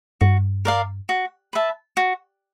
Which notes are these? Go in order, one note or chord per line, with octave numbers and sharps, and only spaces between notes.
G2 F#4
A#4 D5 F5
F#4
B4 E5 A5
F#4